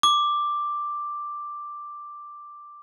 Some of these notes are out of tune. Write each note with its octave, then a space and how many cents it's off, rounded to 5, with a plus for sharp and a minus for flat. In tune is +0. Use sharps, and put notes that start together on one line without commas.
D6 +5